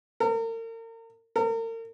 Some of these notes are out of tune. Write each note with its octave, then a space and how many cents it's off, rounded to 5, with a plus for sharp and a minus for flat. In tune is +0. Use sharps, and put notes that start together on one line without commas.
A#4 -40
A#4 -40